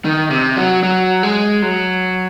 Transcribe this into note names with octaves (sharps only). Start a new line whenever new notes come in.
D#3
C3
F#3
F#3
G#3
F#3